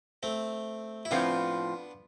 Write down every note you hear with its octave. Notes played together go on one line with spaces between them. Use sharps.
A3 C4
E4
A2 F3 B3 C4 D4 F4